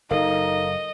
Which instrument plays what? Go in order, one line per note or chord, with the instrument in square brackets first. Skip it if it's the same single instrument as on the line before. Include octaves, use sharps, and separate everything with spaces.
[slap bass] F#1 [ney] D#4 [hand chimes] A4 A#4 F5 [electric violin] D#5